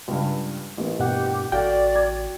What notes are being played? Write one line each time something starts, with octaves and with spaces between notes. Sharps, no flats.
C#2 G2
A1 A#3
G2 B2 G4 F#5
A1 F#4 A4 D5 F5 G5
G#6